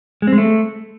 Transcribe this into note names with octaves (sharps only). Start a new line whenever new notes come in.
G#3
C4
G#3
A3